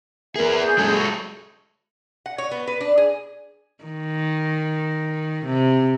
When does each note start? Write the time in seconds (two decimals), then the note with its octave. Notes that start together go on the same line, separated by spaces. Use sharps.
0.36 B3 G#4 A#4 E5
0.62 G#4 G6
0.78 F#3 G#3 A4
0.96 C#6
2.26 F#5
2.38 C#5
2.51 B3
2.67 B4
2.81 D4
2.98 G#4
3.84 D#3
5.46 C3